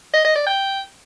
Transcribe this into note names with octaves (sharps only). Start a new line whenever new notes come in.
D#5
D#5
D5
G5